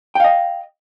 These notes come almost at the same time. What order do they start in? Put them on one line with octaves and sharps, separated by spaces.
G5 F5 D#5